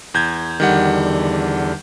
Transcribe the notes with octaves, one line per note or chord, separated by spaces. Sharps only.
E2 G6 G#6
E2 D3 D#3 G3 F#5